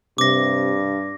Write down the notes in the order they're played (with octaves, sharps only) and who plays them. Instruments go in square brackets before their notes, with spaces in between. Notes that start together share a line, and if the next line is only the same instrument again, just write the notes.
[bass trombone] G2 [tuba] C3 [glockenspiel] D6 A#6